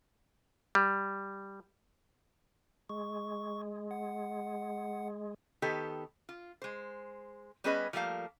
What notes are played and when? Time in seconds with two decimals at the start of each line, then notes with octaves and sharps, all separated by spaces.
0.75 G3
2.89 G#3 C#6
3.91 F#5
5.62 D#3 B3 G4 A4
6.29 F4
6.62 G#3 C5
7.64 G3 B3 C#4 G#4 B4 D#5
7.93 F3 G3 A3 A#3 F5